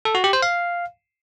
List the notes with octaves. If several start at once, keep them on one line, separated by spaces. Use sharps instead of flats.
A4
F#4
G4
C5
F5